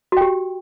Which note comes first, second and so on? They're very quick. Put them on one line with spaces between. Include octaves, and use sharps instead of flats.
F#4 G5 G4